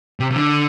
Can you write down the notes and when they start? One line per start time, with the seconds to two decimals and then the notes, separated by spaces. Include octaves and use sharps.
0.20 C3
0.31 C3
0.35 D3